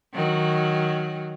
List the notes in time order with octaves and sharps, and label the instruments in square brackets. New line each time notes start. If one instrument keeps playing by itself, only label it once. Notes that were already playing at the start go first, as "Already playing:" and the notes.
[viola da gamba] D#3 F#3